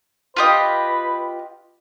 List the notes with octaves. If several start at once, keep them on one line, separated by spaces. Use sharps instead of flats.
F4 G4 B4 D#5